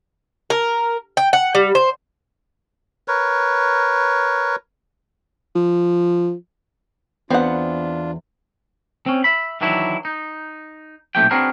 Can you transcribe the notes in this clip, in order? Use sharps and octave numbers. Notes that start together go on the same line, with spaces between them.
A#4
G5
F#5
G3
C5
A#4 B4 C#5
F3
E2 B3 C4 D4 F4 F#5
C4 C#4
E5 B5
D#3 E3 F#3 D4 E4
D#4
B1 A#2 A3 C4 G4 G5
C4 D4 F#4 G#4 A#4 B4